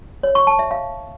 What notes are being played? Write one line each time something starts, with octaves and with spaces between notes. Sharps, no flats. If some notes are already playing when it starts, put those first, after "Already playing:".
C#5
C#6
A5
E5
F5